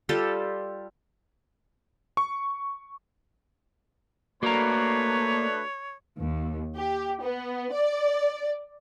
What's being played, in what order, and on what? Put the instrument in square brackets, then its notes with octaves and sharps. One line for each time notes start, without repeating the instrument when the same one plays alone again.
[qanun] G3 F4 G4 A4
[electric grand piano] C#6
[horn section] A3 D4 B4 [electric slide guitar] A#3 [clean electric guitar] F#4 A#5 [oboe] C#5
[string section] D#2
G4
B3
D5